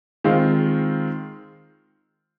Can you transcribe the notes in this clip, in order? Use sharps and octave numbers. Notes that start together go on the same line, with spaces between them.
D#3 G#3 C4 F4